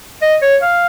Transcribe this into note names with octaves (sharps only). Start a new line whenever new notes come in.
D#5
C#5
F5